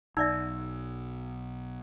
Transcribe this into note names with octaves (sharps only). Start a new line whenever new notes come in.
B1 D#4 D5 E5 E6